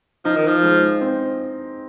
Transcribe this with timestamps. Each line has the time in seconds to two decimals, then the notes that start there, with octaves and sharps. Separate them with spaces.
0.25 F3 D#4
0.36 D#3
0.47 F3
0.63 G#3
1.01 C4